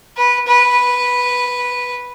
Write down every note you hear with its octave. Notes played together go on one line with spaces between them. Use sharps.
B4
B4